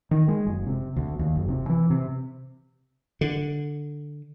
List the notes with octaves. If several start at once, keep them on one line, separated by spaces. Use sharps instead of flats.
D#3
G#3
F#1
C3
D2
D#2
F#1
C3
E3
C3
D3